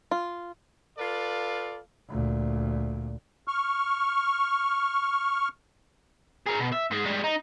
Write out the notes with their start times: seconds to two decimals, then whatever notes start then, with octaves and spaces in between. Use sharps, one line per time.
0.11 F4
0.98 F4 A4 B4 D5 F5
2.09 D2 A#2
3.48 C#6 F6
6.47 G#4 A#4
6.60 B2
6.73 E5
6.91 G#2 G#3
7.06 G3 G#3
7.24 D#4